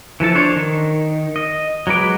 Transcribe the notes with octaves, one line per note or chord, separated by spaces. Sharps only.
E3 F3 A4 A5
D4 C5 C#5
D#3
D#5
F#3 G#3 B4 D6